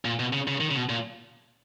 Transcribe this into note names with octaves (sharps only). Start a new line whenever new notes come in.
A#2
B2
C#3
C#3
D#3
C#3
B2
A#2